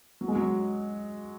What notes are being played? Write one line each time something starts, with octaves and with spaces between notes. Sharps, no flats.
F#3
G#3
F#3